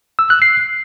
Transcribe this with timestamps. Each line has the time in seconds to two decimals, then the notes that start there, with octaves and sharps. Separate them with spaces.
0.19 E6
0.30 F#6
0.42 C7